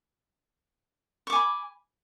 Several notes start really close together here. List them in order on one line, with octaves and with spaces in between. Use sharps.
C#6 D6 G#5 B5